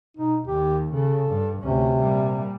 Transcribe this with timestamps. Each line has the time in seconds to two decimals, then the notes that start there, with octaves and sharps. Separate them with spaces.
0.17 B2 D#4
0.48 D#2 G4
0.93 C#3 A4
1.29 G2
1.61 D2 C3 C#4
1.99 A#2 G3